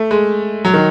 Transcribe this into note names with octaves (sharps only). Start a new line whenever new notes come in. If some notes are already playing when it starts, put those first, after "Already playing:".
Already playing: A3
G#3
F#3
D#3